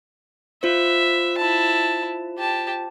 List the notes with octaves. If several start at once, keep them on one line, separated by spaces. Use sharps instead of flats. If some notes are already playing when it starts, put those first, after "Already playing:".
F4 C5 E5
E4 A5
G4 A5